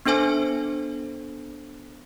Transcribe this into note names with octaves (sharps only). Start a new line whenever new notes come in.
B3 D4 A4 C5 G#5